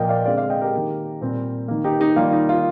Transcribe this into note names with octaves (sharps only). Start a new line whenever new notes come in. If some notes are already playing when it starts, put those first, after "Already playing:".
Already playing: A#2 F3 A#3 D#5 G5
D5 F5
D3 G#3 C4 D5 F5
D5 F5
D#5 G5
G4 A#4
D#3 A#3
A#2 G3 C4
D#3 A#3
D#4 G4
D#4 G4
D#3 G3 A#3 F4
D#4
F4